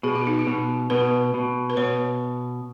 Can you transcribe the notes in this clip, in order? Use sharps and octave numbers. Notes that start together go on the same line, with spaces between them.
B2 G#4
F#4
D#4
F#4
B2
B2 B4
B2
B4
B2 C#5